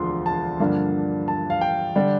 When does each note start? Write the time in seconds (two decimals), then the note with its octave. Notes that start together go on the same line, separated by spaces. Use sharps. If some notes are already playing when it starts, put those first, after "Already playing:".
Already playing: E1 D2 D3 F3 C6
0.26 A5
0.60 G2 D3 F3 A#3 D4
1.28 A5
1.50 F5
1.61 G5
1.96 D3 G3 D4